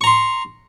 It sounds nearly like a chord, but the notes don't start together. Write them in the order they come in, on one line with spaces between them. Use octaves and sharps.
C#6 A#5 C6